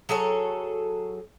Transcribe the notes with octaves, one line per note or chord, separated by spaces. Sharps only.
F#3 G#4 A4 C#5